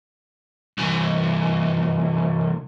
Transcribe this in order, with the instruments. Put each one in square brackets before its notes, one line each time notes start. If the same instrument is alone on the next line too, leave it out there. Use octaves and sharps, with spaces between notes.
[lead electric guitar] C2 E3